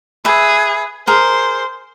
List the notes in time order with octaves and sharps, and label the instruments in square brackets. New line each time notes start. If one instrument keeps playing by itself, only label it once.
[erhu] G#4 [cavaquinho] B4 E5
[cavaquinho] G#4 A#4 [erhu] C5